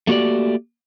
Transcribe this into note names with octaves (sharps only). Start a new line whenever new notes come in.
A3 A#3 F#4 G4 D5